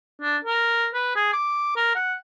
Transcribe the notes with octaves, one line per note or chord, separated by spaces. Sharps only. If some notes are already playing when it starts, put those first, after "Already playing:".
D4
A#4
B4
G#4
D6
A#4
F#5